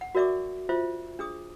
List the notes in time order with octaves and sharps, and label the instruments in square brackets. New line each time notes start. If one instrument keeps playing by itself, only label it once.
[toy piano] F#5
F#4 A#4 D5 E5 C#6 D6
F4 C5 E5
D4 G#4 D#6